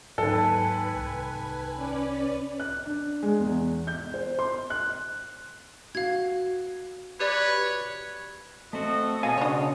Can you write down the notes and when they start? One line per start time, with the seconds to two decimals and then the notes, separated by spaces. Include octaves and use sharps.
0.18 D#2 G#2 F#3 A4 B4 G#5
0.95 C2
1.74 C#4 B4 D5
2.60 F#6
2.85 D4
3.23 G#3
3.40 E2
3.87 G6
4.14 C5
4.39 C6
4.70 F#6
5.95 F#4 F5 G#6
7.20 G4 B4 C#5 D5
8.73 A3 C4 F#4 A4 D#5
9.23 B2 A4 D#5 F5 G#5
9.38 C#3 D4 C#5 D#6